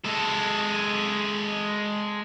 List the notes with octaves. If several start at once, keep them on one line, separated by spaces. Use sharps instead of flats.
G#3 A4